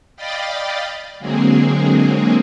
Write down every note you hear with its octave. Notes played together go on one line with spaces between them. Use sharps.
D5 D#5 F5 G5 B5 A6
D3 F#3 G#3 A#3 C4 G#4